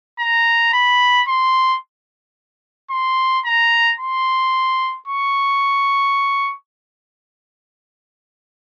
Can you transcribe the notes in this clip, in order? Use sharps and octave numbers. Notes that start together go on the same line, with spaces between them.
A#5
B5
C6
C6
A#5
C6
C#6